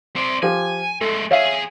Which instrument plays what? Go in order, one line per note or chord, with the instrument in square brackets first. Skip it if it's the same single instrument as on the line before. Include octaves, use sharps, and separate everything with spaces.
[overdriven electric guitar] C4 D5
[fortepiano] F3 G4 [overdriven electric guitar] G#5
[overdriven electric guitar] G#3 A3 [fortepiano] A4
[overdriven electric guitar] E2 G#4 [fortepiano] C#5 E5 F5